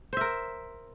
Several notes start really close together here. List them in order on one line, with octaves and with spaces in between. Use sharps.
C5 E5 A#4